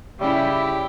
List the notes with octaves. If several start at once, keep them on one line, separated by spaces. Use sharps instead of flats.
C#3 G3 E4 G4 E5